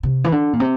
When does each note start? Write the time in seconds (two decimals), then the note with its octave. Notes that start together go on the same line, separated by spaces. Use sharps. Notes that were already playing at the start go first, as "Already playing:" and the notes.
0.03 C3
0.24 E3
0.32 D3
0.53 A#2
0.60 C3